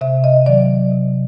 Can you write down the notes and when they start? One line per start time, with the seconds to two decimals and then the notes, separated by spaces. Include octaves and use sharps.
0.01 C3 E5
0.24 D#5
0.46 D#3 F#3 D5
0.91 C3